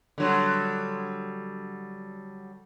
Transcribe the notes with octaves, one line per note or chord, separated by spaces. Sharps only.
D3 F#3 G3